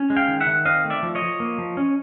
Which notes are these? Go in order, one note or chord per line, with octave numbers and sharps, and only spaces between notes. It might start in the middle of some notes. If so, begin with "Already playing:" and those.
Already playing: C#4
G#3
F5 G5
D#3
E5 F#5
D#3
C4 D#5 F5
A3
D5 E5
F3
C#5 D#5
F3
A#3
F3
C#4